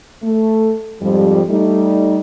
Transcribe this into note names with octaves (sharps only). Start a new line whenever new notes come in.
A3
F2 G#2 F3 G3
G3 A3 D#4